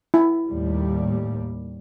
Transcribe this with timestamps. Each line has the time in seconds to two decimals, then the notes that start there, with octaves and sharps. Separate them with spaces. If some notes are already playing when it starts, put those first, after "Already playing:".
0.14 E4
0.48 D#2 A2 G3